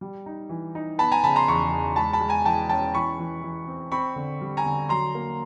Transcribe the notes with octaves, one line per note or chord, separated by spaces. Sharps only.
G3
D#4
E3
D#4
B3 A5 B5
G#5 A#5
C#3 A5 B5
A#5 C6
E2 B5 C#6
E2
G#3 A5 B5
A5 B5
G#3
G#5 A#5
E3 G5 A5
C#4 G5 A5
E3 B5 C#6
E3
E3
C4
C4 B5 C#6
D3
G3
G#5 A#5
D3
F#3 A#5 C6
A#3